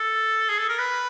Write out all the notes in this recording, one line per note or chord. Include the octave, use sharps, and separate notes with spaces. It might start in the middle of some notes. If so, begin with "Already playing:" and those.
Already playing: A4
G#4
A4
A#4
B4